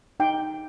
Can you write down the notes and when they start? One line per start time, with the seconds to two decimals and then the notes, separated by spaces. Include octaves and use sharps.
0.20 D#4 G5